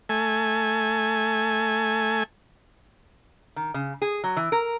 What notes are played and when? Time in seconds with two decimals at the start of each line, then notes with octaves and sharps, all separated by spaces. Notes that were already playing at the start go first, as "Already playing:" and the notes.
0.09 A3 G#5
3.56 D#3
3.74 C#3
4.02 G#4
4.24 F#3
4.37 E3
4.52 A#4